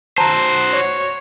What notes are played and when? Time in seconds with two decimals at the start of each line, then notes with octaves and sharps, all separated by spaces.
0.18 F#4 C5 A5 A#5
0.73 C#5